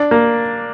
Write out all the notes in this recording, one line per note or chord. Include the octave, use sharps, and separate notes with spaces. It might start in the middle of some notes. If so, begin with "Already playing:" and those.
Already playing: D4
A#3